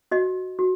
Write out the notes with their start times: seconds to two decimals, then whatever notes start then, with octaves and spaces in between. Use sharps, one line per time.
0.11 F#4 D#5
0.59 F#4